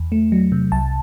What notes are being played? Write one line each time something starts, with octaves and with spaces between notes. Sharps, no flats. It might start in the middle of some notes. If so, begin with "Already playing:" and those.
Already playing: E2
A3
F#3
C3
C2 A5